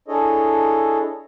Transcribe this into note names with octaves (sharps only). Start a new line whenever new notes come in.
D4 E4 G#4 A4 C#5 D#5